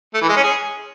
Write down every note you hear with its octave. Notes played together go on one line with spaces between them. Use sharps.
A3
E3
G#3
C#4
G#4